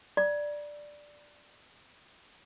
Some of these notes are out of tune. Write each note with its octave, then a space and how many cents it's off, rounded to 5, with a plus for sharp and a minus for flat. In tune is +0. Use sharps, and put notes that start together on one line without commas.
D5 +0 A#5 +45